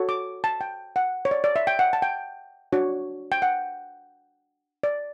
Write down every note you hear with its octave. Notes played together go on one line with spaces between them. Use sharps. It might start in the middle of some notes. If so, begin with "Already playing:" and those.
Already playing: F#4 A4 C#5
D6
A5
G5
F#5
C#5
D5
D5
E5
G5
F#5
A5
G5
D4 F#4 C#5
G5
F#5
D5